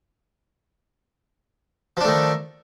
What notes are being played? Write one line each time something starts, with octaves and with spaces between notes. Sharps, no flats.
D#3 F3 A3 D4